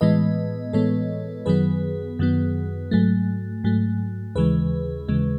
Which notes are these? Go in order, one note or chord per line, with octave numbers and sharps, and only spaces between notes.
A2 E3 G#3 B3 B4 D#5
A2 E3 G#3 B3 A4 C#5
F#2 D#3 F#3 B3 G#4 B4
F#2 D#3 F#3 B3
G#2 F#3 A3
G#2 F#3 A3
D#2 C#3 E3 G#3 G#4 B4
D#2 C#3 E3 G#3